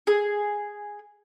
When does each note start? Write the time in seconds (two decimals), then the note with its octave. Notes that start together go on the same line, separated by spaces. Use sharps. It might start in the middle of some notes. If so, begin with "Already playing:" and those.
0.07 G#4